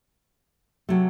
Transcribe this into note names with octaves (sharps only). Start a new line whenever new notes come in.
C3 F#3 A3